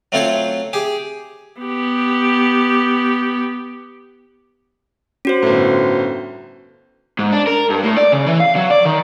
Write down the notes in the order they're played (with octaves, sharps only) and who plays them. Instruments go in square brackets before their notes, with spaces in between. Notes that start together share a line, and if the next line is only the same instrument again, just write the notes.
[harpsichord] F#3 A3 C4 F4 C5 C#5
G4 G#4
[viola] B3 G4
[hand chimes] C#4 F#4 C5
[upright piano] G1 A2
[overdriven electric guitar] G#2
D4
A#4
G2
A2
D5
C#3
E3
F5
F#3
D5
D#3